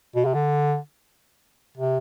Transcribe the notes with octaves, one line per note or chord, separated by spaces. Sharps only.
B2
C3
D3
C3